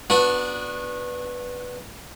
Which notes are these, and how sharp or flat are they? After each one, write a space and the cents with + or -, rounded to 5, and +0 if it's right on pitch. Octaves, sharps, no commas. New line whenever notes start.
B3 +0 D4 +0 F#4 -30